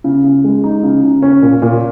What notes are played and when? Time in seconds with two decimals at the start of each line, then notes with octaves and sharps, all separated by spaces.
0.04 C#3
0.24 C#3
0.44 G#3
0.64 D#4
0.83 C#3
1.03 C#3
1.22 C#4
1.42 A#2
1.62 A#2